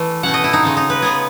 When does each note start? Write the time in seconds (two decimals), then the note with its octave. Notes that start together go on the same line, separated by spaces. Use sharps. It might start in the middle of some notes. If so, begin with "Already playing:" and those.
Already playing: E3 A3
0.23 B2 A3 C#4 F#5
0.34 D#5
0.44 E4
0.53 D#4
0.63 C#3 G#3 C#4
0.77 D#4
0.90 B4
1.02 C#3 G#3 B3 G#4